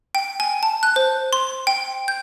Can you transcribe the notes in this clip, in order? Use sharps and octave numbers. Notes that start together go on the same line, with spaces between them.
G5
G#5
A5
F#6
C5
C6
G5
G6